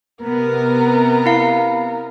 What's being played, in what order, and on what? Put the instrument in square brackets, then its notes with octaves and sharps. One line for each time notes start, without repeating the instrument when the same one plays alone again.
[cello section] C3 B3 [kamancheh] A#4
[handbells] E4 F5